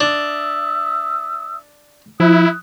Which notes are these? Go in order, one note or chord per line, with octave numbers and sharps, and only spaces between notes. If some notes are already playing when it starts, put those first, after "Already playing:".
D4 E5 D#6 E6
F3 E4 D#6 F#6